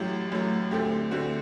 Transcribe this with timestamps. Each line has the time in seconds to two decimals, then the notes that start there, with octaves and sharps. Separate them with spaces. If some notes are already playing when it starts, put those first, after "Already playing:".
Already playing: A1 A2 F#3 G4
0.32 A1 A2 F#3
0.71 D2 D3 A3 C4 G4
1.11 D2 D3 A3 C4 F#4